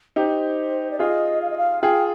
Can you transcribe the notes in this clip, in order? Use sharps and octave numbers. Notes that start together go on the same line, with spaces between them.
D#4 G4 C5
D5
F4 G#4 D#5
F5
D#5
F5
F4 G#4 G5